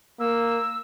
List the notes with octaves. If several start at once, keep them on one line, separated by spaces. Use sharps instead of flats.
A#3 E6